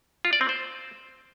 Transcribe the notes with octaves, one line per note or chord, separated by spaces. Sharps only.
F4
D5
C4
C5